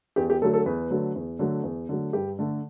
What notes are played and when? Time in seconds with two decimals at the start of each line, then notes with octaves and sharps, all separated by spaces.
0.16 E2 G4
0.30 G4
0.42 D3 F#3 A3 A4
0.53 A4
0.66 E2 B4
0.90 D3 F#3 A3
1.16 E2
1.39 D3 F#3 A3
1.64 E2
1.89 D3 F#3 A3
2.13 G2 G4
2.39 D3 A3